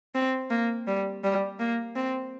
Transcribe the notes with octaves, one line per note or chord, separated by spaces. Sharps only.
C4
A#3
G3
G3
A#3
C4